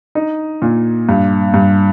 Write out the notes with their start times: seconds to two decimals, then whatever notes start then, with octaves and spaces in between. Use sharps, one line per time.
0.15 D#4
0.62 A#2
1.09 G2
1.54 G2